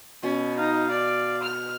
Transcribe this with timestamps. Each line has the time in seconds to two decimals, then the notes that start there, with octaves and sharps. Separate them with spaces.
0.23 B2 C#4
0.58 D#4 F5
0.91 D5
1.43 F6